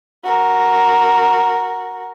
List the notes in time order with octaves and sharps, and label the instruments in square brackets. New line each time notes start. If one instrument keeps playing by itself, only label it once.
[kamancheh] F#4 A#4